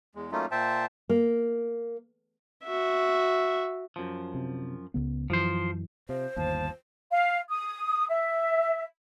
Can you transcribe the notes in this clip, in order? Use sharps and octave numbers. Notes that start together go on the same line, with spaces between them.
E2 G#3
F#3 A3 A#3 C#4 D#4 F4
A#2 C5 E5 G5 A5
A#3
F#4 E5
F#2 F3
C3
C#2 C#3 B3
F#2 E3 F3 C5
C3 F3 C5
G1 D#2 F3 A5
F5
D#6
E5